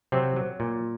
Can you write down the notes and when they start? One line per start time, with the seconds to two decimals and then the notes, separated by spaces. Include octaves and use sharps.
0.12 C3 F#3 C4
0.36 F#3
0.60 A#2